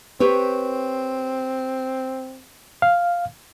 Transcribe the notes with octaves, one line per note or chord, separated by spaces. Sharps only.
C4 G4 B4 C#5
F5